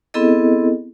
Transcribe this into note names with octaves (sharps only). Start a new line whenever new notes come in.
B3 C4 E4 G#4 A4 D#5